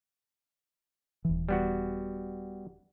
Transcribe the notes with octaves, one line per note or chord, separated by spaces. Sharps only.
D#1 E3
G3 B3 F#4